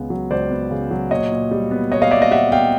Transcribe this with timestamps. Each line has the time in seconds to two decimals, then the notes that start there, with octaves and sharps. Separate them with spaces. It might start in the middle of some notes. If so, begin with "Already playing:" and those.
Already playing: C#2 C#3 B3
0.10 F#3
0.31 C#2 C5 D5
0.51 B3
0.71 C#3
0.91 F#3
1.11 A#2 C#5 D#5
1.31 A#2
1.51 G3
1.71 B3
1.91 A#2 C#5 D#5
2.02 D#5 F5
2.11 A#2 D5 E5
2.22 D#5 F5
2.31 G3 E5 F#5
2.52 B3 F5 G5